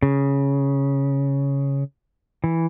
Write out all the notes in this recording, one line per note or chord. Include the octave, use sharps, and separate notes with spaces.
C#3
E3